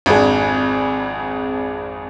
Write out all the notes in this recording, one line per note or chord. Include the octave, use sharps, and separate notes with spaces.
G#1 F2 D4 G#4